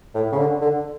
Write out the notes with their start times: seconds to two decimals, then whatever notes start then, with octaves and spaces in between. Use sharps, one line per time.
0.15 A2
0.32 C#3
0.38 D3
0.61 D3